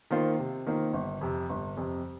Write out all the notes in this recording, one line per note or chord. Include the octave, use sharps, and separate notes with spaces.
D#3 A#3 F4 C5
C3
D#3 A#3 F4 C5
G1
F2 C3
G1
F2 C3